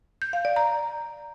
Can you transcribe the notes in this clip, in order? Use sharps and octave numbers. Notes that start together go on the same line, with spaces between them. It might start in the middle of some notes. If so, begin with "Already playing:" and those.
G6
F5
D5
A#5